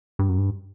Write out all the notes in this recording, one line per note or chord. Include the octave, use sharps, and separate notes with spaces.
G2
F#2
G2